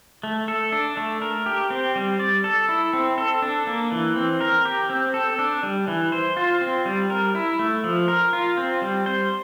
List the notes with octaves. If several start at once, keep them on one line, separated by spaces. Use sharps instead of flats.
A3
A4
D4
A3
A#4
G4
C4
G3
D5
A4
E4
C4
A4
D4
A#3
E3
C4
A#4
G4
C4
A4
D4
G3
E3
C5
F4
C4
G3
A#4
E4
A3
F3
A#4
F4
C4
G3
C5